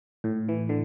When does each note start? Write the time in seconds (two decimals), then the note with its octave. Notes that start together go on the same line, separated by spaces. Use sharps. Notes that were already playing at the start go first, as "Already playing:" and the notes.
0.24 A2
0.49 E3
0.69 D3